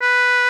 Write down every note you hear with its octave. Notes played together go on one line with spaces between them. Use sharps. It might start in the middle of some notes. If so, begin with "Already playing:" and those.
B4